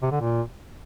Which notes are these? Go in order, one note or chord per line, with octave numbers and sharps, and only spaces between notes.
C3
D3
A#2